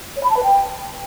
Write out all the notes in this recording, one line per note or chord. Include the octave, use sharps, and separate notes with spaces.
C#5
B5
A5
B4
G5